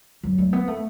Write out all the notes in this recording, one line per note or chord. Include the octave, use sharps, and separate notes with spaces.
F#3
A3
B3
A3